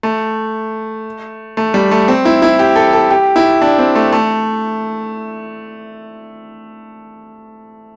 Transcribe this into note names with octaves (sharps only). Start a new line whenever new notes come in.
A3
A3
G3
A3
C4
E4
E4
G4
A4
A4
G4
E4
D4
C4
A3
A3